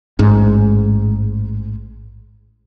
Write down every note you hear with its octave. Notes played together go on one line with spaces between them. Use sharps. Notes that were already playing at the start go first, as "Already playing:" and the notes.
A1 G#2